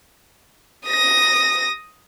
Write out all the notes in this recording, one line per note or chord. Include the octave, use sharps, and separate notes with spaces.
D#6 A#6